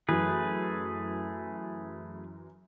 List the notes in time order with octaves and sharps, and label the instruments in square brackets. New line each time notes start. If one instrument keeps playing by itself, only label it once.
[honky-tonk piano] F#2 E3 [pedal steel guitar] A3 G#4 B4